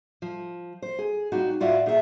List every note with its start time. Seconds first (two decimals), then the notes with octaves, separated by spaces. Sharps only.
0.22 F3
0.82 C5
0.99 G#4
1.32 G3 C4 D#4 F4 F#4
1.60 A2 F4 F#4 D5 E5 F5
1.86 A#2 A3 G#4 A#4 E5